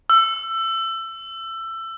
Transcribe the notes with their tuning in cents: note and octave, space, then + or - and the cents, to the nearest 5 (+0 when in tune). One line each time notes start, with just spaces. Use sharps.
E6 +20